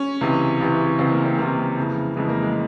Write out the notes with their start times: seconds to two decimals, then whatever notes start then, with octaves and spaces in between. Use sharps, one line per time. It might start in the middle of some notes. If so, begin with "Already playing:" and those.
Already playing: C#4
0.21 C#2 C3 E3
0.60 C#2 C3 E3
0.99 C#2 C3 E3 C4
1.12 A#3
1.25 C4
1.38 C#2 C3 E3 A#3
1.77 F2 C#3 E3
2.16 F2 C#3 E3 G#3
2.29 A#3
2.42 G#3